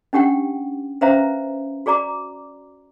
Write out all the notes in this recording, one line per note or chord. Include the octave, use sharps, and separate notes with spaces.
C#4 D4 G4 F#5 G5
C#4 B4 C5 E5 F5 A#5
F#4 G#4 D5 A#5 D6